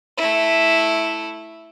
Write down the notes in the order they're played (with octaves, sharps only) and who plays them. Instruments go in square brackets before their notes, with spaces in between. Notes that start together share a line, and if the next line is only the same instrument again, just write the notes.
[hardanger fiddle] A3 E4